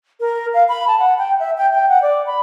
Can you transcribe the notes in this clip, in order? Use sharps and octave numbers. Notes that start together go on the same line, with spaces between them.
A#4
F5
B5
A5
F#5
G5
E5
G5
G5
F#5
D5
B5